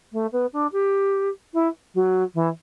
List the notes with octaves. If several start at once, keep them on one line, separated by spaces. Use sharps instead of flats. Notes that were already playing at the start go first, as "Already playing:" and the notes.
A3
B3
D4
G4
E4
F#3
E3